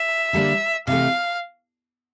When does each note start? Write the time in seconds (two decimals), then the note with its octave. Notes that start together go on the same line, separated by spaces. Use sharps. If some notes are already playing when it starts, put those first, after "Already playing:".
Already playing: E5
0.33 D3 G3 A#3 D4
0.87 C3 E3 A3 F5